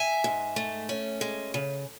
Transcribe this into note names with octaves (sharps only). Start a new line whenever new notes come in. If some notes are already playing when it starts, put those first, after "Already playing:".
Already playing: E5 G#5
G#2
A3
C#4
G#3
C#3